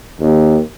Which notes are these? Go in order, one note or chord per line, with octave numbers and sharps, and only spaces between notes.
D#2